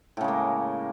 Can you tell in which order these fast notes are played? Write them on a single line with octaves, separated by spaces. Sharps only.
A2 C#3 G#3 A#3